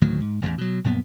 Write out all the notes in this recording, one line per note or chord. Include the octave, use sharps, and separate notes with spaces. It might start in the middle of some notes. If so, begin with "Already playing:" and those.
D2 A2 D#3 F#3
G#2
E1 A1 E2
B2 F#3
A#1 F#2 A#2 B3